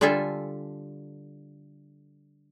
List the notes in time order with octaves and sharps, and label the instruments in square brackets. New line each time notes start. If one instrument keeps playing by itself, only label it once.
[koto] D3 G3 F4 A4 E5 G#5